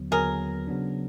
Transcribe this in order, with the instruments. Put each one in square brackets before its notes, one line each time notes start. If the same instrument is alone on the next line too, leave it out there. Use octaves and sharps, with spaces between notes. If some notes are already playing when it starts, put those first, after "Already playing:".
Already playing: [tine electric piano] D#2 D3 F#3 B3
[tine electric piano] D#2 D3 F#3 B3 [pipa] G#4 A#4
[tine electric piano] C#3 F#3 B3 D4